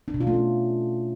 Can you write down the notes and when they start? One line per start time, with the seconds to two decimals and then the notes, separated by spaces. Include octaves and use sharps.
0.08 D4
0.14 B2
0.21 F4
0.27 A3
0.33 C#4